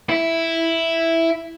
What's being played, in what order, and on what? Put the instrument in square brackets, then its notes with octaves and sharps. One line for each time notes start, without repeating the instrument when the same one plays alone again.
[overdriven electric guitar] E4